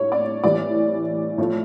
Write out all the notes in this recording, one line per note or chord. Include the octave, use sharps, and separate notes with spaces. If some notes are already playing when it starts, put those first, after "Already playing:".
Already playing: A2 G3 C#5
D5
A2 E3 G3 D5
A2 F3 A3